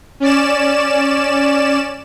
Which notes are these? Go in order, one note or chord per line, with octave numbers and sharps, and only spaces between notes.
C#4 D5 E7